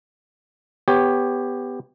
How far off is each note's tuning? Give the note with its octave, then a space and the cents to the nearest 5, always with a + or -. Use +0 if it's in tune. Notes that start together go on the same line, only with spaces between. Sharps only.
B3 +15 G4 +15 C#5 +0